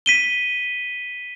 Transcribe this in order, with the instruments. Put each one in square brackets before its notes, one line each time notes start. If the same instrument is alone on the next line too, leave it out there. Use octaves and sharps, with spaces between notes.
[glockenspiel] B6 D#7 G7